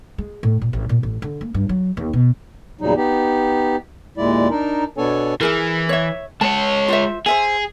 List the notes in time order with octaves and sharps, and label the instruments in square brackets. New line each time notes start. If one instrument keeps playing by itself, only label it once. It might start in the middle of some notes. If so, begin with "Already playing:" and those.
[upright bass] G#3
A2
A#2
A1
A#2
A1
D3
A#3
G2
F#3
D#2
B2
[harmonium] E2 A#2 C#3 F#3 G3 D#4
B3 D#4 G4
D#2 A#2 G#3 E4 D5
D4 D#4 A#4
B2 B3 D4 A4 C#5 G#5
[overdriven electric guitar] E3 [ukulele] E4 G#4 A#4
[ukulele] C#5 E5
[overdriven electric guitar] G#3 C#5 [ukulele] A5
[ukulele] F4 C5 E5
[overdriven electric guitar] G#4 [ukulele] C5 E5 G#5